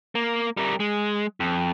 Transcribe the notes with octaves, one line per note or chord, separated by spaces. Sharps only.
A#3
G3 A#4
G#3
F2